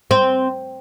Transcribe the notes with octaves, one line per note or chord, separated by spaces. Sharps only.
C4